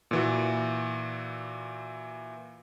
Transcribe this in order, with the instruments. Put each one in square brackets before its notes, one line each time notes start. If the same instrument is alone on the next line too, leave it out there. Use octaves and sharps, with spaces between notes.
[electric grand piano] A#2 E3 F#4